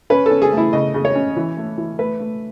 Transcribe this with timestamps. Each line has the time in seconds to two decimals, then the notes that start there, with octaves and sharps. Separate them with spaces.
0.10 C#4 B4
0.26 A4
0.31 C#4
0.42 G#4
0.52 A3 E4
0.73 C#3 D#5
0.94 C#3
1.05 C#5
1.15 C#4
1.36 E3
1.57 A3
1.78 E3
1.99 A3 B4
2.20 A3